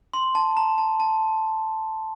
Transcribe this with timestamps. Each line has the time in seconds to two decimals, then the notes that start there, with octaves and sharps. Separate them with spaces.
0.14 C6
0.35 A5
0.57 A#5
0.78 A5
1.00 A5